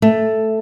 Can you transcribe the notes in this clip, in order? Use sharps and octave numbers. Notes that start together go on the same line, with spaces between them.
A3